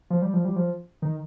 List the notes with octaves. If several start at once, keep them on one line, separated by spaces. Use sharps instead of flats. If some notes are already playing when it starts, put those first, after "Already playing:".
F3
G3
F3
G3
F3
D#3